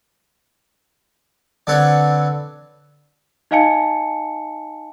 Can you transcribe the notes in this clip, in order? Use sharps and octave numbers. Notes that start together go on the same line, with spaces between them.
D3 C4 A4 B4 C#5
D#4 D#5 F5 G#5 A5 C#7